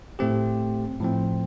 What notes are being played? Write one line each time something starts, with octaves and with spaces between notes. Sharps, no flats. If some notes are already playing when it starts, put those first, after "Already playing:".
A2 A3 C4 G4
A2 F3 C4